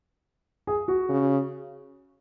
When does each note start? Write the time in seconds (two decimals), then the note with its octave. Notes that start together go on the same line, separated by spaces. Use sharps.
0.67 G#4
0.88 F#4
1.09 C#3